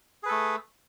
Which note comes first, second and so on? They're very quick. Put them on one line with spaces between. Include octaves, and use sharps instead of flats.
G#4 B4 A4 A3